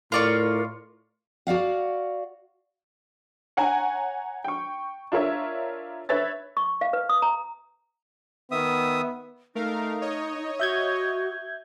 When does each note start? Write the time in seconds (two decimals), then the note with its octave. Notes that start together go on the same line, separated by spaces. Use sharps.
0.12 A2 F4 A#4 D5 C#6
1.47 F#4 D5 F5 F#5
3.57 C#5 F#5 G#5 A#5
4.44 G5 C#6
5.12 D4 F4 A#4 C#5 E5
6.09 B4 C#5 E5 A6
6.57 C#6
6.81 F5
6.93 B4
7.09 D#6
7.22 A#5
8.52 D#3 B3 E5 D#6
9.55 A3 D#4 A#4 F5
10.02 C#5 D#5
10.60 F#4 E5 G6 G#6